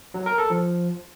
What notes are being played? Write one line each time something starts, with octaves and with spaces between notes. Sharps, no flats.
F#3
A#4
A4
F3